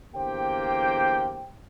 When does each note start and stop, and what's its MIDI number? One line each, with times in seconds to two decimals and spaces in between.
0.15 1.53 40
0.15 1.53 50
0.15 1.53 58
0.15 1.53 67
0.15 1.53 72
0.15 1.53 79